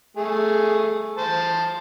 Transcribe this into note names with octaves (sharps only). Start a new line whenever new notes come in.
A3 G#4
C5 A5